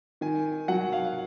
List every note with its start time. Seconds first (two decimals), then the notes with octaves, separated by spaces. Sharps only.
0.21 D#3 G#5
0.68 F#3 F#5
0.93 F5